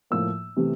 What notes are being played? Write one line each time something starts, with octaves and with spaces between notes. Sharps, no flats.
A2 F3 A#3 E6
C3 E3 A3